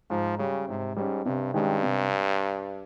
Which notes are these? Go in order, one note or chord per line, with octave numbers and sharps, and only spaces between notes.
G#2 F3
C#3 G3 C#4
G#2 C3
G#2 G3 C#4
G2 C3
G2 D#3 G#3 C#4 G4
C3